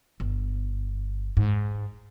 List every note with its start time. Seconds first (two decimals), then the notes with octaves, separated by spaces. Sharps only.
0.20 G1
1.37 G#2